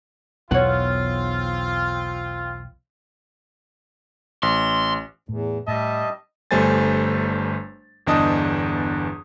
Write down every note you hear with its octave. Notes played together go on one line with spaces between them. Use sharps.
B1 E2 E3 C4 F4 C#5 F#5
A1 C6
E2 A2
A2 G3 D#5 E5 A5
G1 G3 A3 C5 G#5 A6
G1 E2 D4 D#5 A5 D#6